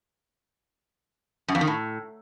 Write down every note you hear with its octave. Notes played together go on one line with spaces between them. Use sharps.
F#2
F2
D#3
A2